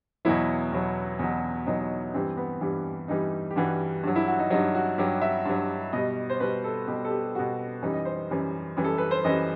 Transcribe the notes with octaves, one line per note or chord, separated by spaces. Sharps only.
E2 B2 F#3 E4
E2 B2 F#3
E2 B2 F#3
E2 B2 F#3 D#4
G2 E3 G3 C4
B3
G2 E3 G3
G2 E3 G3 D#4
G4
G2 E3 G3 F#4
G2 F#3
E4
F#4
D#4
G2 F#3 D#4
F#4
G2 F#3 G4
E5
G2 F#3
B2 G3 D#5
C5
B2 G3 B4
A4
B2 G3 G4
A4
G4
B2 G3 F#4
F#2 E3 G3 D#4
D#5
C5
F#2 E3 G3
F#2 E3 G3
A4
B4
C5
F#2 E3 G3 D#5